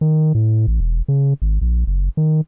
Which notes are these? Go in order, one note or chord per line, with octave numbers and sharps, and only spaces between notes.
D#3
A2
A1
E1
C#3
G#1
A#1
F#1
D#3